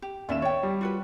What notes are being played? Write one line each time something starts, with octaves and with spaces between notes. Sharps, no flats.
G4
D#2 C#4 D5 E5 E7
C#5 D5 G5
G3
F4 F#4 B4